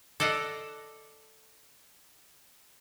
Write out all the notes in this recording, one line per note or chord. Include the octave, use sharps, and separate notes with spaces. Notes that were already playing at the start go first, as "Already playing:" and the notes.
A4 D5 D#5 F5 F#5